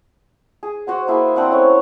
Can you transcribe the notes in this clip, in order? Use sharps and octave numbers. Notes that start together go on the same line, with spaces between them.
G#4
F#4 C5 F#5
A#3 E4 G#4
C4 D4 F#5 E6
A3 C#4 C#5